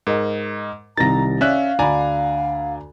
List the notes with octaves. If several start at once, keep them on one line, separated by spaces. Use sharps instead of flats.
G#2 A#4 D#5
C2 C3 D#3 A#5 A6 A#6
C#4 D5 E5 F5 F#6
D2 D4 D5 G#5 A#5 B5